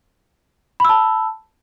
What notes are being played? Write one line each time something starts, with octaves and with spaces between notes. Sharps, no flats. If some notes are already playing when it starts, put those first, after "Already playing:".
A5 B5 E6